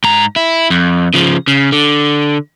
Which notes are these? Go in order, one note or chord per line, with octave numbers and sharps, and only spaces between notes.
G#2 A#5
E4
F2
C#3 F3
C#3
D3